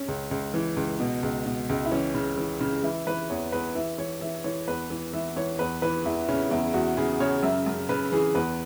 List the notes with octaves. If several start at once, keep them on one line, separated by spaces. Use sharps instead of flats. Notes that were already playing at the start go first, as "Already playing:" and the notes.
Already playing: C#4
C#2
C#2
E3
C#2
B2
C#2
B2
C#2
E4
E3 C#4
C#3
E3
C#3
E3 E4
E3 B4
E2 C#5
E2 B4
E3 E5
E3 C#5
E3 E5
E3 C#5
E2 B4
E3
E3 E5
E3 C#5
E2 B4
E3 B4
E2 E4
C#3 C#4
E2 E4
E2 F#4
C#3 G#4
C#3 C#5
F#2 E5
F#2
C#3 B4
E3 G#4
E2 B4